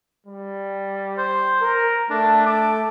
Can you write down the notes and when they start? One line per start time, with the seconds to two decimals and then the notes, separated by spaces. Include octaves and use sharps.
0.26 G3
1.18 C5
1.61 A#4
2.10 A3 D4
2.46 D6